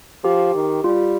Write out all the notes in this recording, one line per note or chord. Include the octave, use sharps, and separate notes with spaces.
F3 G4
D#3
G3 F4